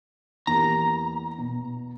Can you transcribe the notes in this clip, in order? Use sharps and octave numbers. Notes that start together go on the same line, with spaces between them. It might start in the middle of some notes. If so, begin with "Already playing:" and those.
E2 A#3 G4 A#5
B2